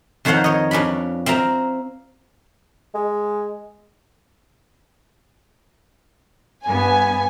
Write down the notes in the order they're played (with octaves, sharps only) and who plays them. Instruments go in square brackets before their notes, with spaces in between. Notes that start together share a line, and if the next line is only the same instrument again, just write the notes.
[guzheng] F2 D#3 C5 C#5 F5 F#5
C#5 D#5
F2 C#4 D4 B5
C4 E5 F5 A#5
[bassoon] G#3
[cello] G2 B3 [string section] G#5